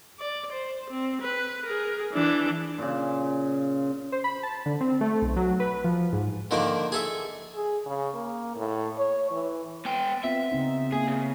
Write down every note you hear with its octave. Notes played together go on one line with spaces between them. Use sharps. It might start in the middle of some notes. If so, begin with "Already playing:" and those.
D5
C5
C4
B4
G#4 A#4
E3 D4
A#2 C#3
C5
B5
A5
D3
C4
A3
B1
F#3
B4
F3
G#2
D3 D#3 F3 A#3 D4
G#4 A4 E5
G#4
C#3
A#3
A2
C#5
E3
B3 G5
B3 C4 F4 E5
C#3 C4 D#4
A#3 G#4
C#3